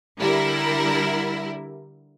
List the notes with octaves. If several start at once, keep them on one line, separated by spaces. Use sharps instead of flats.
D3 G3 E4 A#4